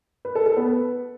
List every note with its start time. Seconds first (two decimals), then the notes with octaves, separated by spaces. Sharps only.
0.25 B4
0.35 A4
0.46 A4
0.57 B3
0.67 B4